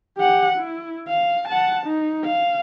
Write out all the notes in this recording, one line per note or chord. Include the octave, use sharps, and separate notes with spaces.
G4 F#5
E4
F5
F#5 A5
D#4
F5